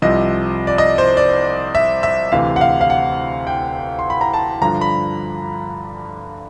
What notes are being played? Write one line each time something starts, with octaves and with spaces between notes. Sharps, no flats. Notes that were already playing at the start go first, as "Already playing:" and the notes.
C2 C3 F3 D#5
D5
D#5
C5
D5
E5
E5
D2 C3 E3 F5
F#5
F5
F5
F#5
G5
C6
B5
A#5
A5
G2 D3 F3 A#5
B5